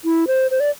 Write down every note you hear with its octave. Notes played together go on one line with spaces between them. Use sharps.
E4
C5
C5
D5